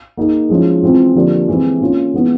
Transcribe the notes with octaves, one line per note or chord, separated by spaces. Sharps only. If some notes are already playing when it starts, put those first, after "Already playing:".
A#3 D#4 G#4
F3 G#3 C#4 E4 G#4
E3 G#3 C4 F4
D3 F3 A#3 D4 G4
E3 G#3 C4 E4 G#4
A#3 C#4 F4
E3 G#3 B3 E4